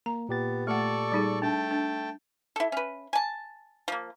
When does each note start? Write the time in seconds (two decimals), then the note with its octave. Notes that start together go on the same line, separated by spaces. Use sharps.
0.06 A#3 A#5
0.29 A#2 B3 G4 A6
0.67 A3 A4 D5 F#5 C#6
1.12 G3 D#4 G#4
1.42 A3 D4 G5 A5
1.71 D4
2.56 E4 A4
2.72 C#4 B4
3.13 G#5 A5
3.88 F3 A#3